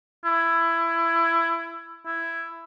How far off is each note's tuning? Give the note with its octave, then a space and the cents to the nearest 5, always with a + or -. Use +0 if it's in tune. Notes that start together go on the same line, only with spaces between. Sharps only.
E4 +20
E4 +10